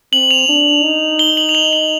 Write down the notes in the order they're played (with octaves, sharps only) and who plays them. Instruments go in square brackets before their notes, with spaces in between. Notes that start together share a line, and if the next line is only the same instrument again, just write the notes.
[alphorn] C4 [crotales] F#7
[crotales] F7
[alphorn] D4
D#4
[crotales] G7
F#7
F7
F#7
F#7